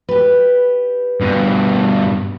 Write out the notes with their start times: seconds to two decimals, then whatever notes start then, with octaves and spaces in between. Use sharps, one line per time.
0.09 G4 B4
1.21 G2 B2